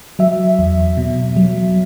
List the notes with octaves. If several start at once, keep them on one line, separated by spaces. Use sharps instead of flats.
F#3 E5
E2
B2
F#3